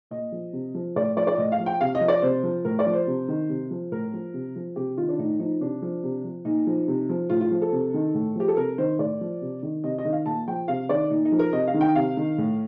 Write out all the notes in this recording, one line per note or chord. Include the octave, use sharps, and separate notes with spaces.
A#2 D#5
F3
C3
F3
A2 D5
F3 D5
D5
A2 D#5
F5
F3
G5
C3 F5
D#5
F3
D5
C3 C5
F3
A2 A#4
D5
F3
C5
C3
D#3
C3
F3
A2 A#4
F3
C3
F3
C3 G4
D#3 F4
D4
A2 D#4
F3 D#4
C3 D4
F3
C3
F3
A#2 D#4
F3
C3
F3
A2 F4
F4
F3
A4
C3
D#3
A2
F3 G4
A4
C3 A#4
D#3 C5
A2 D5
F3
C3
D#3
C3 D#5
D#5
D#3
F5
A#2 A5
F3 G5
C3 F5
D#3 D5
A#2 D#4
D#4
F3
A#4
C3 D#5
F5
D#3
G5
C3 F5
D#3
A2